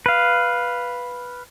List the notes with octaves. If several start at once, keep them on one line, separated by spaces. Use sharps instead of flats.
B4 F5